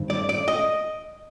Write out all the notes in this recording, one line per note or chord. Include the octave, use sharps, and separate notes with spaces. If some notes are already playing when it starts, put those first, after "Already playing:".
Already playing: G2 D#3 C4
D5
D5
D#5